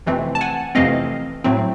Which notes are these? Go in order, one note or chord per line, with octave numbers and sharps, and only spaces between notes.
F2 C3 E3 A3 C4
A5
F#5 G#5
F2 C3 E3 A3 C4 D#5 F5
A2 F#3 A3 C4